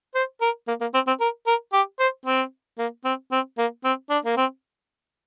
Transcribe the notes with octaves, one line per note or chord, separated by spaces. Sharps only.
C5
A#4
A#3
A#3
C4
C4
A#4
A#4
G4
C5
C4
A#3
C4
C4
A#3
C4
D4
A#3
C4